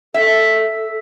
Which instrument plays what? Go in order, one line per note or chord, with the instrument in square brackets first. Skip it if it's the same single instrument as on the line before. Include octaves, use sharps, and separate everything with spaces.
[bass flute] A4 [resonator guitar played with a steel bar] E5